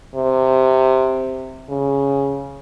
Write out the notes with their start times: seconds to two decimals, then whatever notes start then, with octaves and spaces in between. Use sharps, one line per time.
0.15 C3
1.69 C#3